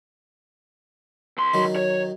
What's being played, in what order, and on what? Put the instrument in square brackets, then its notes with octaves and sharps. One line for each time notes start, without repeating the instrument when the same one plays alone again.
[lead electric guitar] C#2 C6
[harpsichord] D#3 F#3
[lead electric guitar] C#5